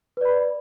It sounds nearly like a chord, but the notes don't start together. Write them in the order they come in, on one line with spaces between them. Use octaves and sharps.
B4 D5 B5